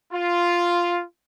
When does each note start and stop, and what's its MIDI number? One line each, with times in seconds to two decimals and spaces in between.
0.13 1.03 65